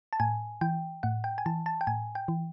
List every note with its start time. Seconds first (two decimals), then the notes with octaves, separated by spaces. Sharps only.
0.13 A5
0.20 A2 G#5
0.61 E3 G5
1.03 A2 F#5
1.24 G5
1.38 G#5
1.46 E3 A5
1.66 A5
1.81 G5
1.87 A2 G#5
2.15 G5
2.28 E3